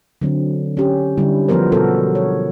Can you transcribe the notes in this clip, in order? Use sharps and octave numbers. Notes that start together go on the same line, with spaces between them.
D3 F#3 C4
C#4 G4
D3 G3 E4
F3 F#3 B3 A#4 C5
B2 B3 F#4 A4 A#4
C#5